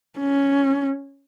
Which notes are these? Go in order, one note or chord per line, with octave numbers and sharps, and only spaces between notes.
C#4